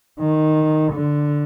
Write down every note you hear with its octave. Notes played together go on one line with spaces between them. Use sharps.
D#3
D3